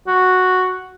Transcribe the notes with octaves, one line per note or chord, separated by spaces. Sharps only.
F#4